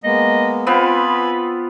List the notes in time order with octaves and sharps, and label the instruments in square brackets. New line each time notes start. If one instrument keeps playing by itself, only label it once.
[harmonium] G#3 A#3 B3 [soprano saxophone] D#5
[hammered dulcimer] B3 C4 F4 [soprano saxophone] B4 [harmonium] G#5